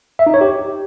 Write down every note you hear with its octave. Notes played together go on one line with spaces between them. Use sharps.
E5
D#4
C#5
G4